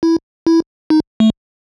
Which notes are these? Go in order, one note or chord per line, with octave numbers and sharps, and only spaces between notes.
E4
E4
D#4
A3